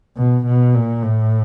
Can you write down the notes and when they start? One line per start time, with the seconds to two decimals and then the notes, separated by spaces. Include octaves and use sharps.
0.17 B2
0.46 B2
0.74 A#2
1.02 A2